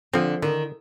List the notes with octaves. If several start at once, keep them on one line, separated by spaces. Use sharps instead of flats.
D3 F3 C4
D3 D#3